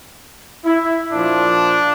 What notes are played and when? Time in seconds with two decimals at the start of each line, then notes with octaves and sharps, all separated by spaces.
0.65 E4
1.11 A#2 F3 D4